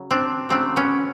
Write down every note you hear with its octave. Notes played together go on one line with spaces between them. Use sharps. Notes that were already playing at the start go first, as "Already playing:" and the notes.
Already playing: C#3 F#3
C4 D4
C#3 F#3 A3 C4 D4
B3 C#4